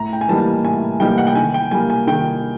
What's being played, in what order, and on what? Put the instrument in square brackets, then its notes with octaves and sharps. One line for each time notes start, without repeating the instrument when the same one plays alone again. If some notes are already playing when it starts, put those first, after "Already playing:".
Already playing: [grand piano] A2 A#5
G5
G#5
E3 G3 A#3 D#4 A5
A2 G#5
E3 G3 A#3 D#4 G5
F#5
G5
D#3 G#5
G5
G3 A#3 G#5
G#5
D#3 G5